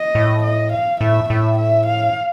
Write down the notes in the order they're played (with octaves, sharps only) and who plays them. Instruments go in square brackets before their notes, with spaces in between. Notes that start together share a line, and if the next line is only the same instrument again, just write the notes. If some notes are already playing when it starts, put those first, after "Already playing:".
Already playing: [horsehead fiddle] D#5
[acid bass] A2
[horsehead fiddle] D#5
F5
[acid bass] A2 [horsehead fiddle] E5
[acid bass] A2 [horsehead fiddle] E5
[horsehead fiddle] E5
F5